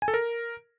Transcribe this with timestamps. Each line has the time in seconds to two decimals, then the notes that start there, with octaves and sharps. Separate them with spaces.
0.02 G#5
0.08 A4
0.14 A#4